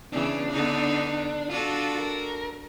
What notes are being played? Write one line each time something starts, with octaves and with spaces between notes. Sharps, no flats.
C#3 E3 B3 D4
D3 B3 D#4
D4 F4 F#4 A4
A#4